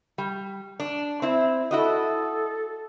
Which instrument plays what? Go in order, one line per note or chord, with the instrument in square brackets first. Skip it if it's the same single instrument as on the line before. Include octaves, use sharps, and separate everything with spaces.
[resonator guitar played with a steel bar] G3
D4
C4 E4
[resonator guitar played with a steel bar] E4 F#4 D#5 [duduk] A4